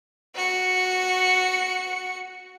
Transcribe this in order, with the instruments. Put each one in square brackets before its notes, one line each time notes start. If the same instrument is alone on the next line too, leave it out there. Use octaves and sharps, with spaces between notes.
[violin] F#4 C#7